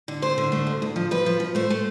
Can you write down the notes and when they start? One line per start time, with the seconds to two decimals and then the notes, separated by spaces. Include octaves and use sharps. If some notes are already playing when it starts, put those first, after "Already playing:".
0.08 D3
0.22 A3 C5
0.38 D3
0.52 A3
0.67 D2
0.82 D2
0.96 F3
1.11 F3 B4
1.26 F3
1.40 F3
1.55 A3 C5
1.70 A3